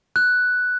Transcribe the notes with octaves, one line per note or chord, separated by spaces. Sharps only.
F#6